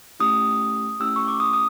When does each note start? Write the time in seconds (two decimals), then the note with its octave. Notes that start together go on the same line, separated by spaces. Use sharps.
0.20 A3 C#4 E4 G4 D#6
1.00 A3 C#4 E4 G4 E6
1.16 C#6
1.28 D6
1.40 D#6
1.54 D#6